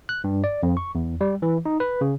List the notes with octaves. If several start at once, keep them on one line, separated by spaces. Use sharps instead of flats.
F#6
G2
D5
F2
C#6
E2
G3
E3
D#4
B4
C#3